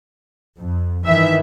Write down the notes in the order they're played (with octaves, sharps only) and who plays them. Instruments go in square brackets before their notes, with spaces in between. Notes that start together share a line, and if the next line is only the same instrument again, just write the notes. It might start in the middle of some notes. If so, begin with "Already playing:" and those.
[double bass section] F2
[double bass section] G2 D#3 E3 [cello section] E5